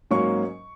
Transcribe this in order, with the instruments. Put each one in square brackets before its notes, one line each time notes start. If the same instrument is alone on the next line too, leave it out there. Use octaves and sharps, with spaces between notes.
[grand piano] G#2 F#3 A#3 C#4 C#6